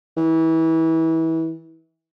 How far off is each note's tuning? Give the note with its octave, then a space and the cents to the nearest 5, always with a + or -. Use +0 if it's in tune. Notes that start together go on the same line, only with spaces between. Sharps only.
E3 -25